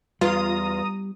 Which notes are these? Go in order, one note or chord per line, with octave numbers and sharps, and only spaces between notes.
E2 G3 F4 A#5 D#6